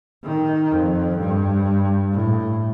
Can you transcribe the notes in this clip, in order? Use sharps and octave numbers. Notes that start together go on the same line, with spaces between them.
D#3
F2
G2
A2